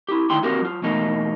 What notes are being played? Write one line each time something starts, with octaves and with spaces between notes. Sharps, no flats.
E4 G4
D2 D#3 E4 G5 C6
A#3 C4 F#4 G4 A#4
F#3 F4
E2 B2 A3 A#3 D#4